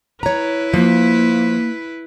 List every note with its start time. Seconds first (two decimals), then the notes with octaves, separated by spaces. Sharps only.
0.23 E4 B4 C#5 A#5
0.74 F3 A#3